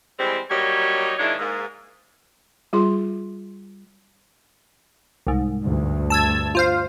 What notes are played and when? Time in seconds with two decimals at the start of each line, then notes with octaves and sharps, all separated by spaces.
0.18 E3 G3 G#3 C4
0.50 F#3 G3 A#3 D#4 C#5
1.18 D#3 F3 G#3 D4 E4 C#5
1.38 G#2 A#3
2.73 G3 F4 G#4 C6
5.27 C2 G#2
5.64 D2 G2
6.10 A5 E6 G#6
6.55 F4 C5 F5